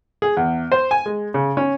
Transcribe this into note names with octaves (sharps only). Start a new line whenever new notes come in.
G#4
E2
C5
G#5
G#3
C#3
C#4